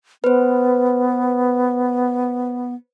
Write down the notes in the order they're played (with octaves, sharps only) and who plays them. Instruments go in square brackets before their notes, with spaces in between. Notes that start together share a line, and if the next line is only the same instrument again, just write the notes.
[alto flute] B3 [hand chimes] B4 C5